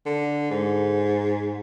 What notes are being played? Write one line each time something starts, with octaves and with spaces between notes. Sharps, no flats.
D3
G#2